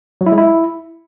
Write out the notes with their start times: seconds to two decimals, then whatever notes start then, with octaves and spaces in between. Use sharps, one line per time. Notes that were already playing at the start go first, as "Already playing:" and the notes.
0.21 F#3
0.26 E4
0.32 G#3
0.38 E4